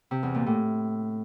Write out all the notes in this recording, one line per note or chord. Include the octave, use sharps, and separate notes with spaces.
C3
E2
A#2
A2